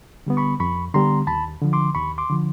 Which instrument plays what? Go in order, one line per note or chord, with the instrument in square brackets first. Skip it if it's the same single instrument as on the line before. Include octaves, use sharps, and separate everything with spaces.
[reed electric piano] D3 G3 B3
B5 C#6
F2 B5 C#6
D3 G3 B3 A#5 C6
D#2 A5 B5
D3 F3
C6 D6
D#2 B5 C#6
C6 D6
D3 F3